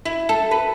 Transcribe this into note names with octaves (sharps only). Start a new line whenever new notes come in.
E4
A4
B4